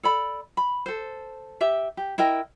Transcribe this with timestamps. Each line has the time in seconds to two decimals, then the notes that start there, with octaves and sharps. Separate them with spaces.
0.03 A4 D5 B5
0.57 B5
0.86 A4 C5
1.61 G4 E5
1.97 G4
2.18 E4 A#4 D#5 G5